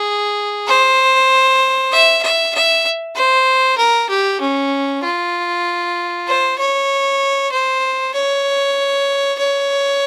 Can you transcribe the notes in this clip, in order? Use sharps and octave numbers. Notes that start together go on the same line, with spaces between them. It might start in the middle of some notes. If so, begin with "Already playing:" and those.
Already playing: G#4
C5
E5
E5
E5
C5
A#4
G4
C#4
F4
C5
C#5
C5
C#5
C#5